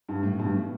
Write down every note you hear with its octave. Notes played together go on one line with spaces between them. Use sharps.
G2
A2
G2 B2
A2